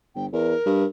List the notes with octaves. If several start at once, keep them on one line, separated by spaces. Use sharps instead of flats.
G1 G5
E2 A#4
G2